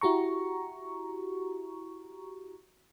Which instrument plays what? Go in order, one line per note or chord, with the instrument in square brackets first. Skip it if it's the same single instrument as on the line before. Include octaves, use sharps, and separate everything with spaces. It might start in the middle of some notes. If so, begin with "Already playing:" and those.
[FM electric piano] E4 F#4 G4 A#5 C#6